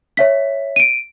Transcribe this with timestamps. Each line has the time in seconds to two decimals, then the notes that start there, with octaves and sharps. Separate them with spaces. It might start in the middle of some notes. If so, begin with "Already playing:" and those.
0.17 C#5 E5 B6
0.76 D7 D#7